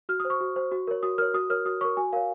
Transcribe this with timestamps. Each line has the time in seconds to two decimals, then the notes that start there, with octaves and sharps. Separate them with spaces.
0.09 F#4 F6
0.20 D#6
0.25 C5
0.30 C#6
0.41 F#4
0.56 C5
0.72 F#4
0.87 A#4 C#5
1.03 F#4 D#6
1.18 A#4 C#5 F6
1.34 F#4 D#6
1.50 A#4 C#5 F6
1.66 F#4 D#6
1.81 A#4 C#5 C#6
1.97 F#4 G#5
2.13 A#4 C#5 F5